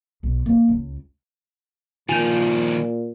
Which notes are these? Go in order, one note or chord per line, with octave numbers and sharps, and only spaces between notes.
B1
A#3
C#2
A#2 D#3 F3 F4 G#5 G6 F7